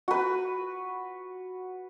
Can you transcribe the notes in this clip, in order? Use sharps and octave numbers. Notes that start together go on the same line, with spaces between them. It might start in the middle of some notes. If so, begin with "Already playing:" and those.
F#4 B4